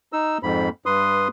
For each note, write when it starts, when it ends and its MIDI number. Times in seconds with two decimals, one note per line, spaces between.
0.13 0.38 63
0.13 0.38 88
0.43 0.69 41
0.43 0.69 44
0.43 0.69 83
0.86 1.28 43
0.86 1.28 71
0.86 1.28 84
0.86 1.28 87